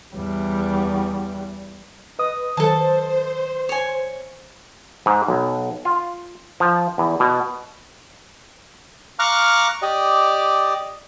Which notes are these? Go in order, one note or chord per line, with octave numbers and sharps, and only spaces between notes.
E2 G3
B4 D#5 D#6
D#3 F#3 A4 C5 A5
C#5 G#5
G#2
B1
F4
F3
E2
B2
F5 A#5 C#6 D6 F6 F#6
G4 D5 D#5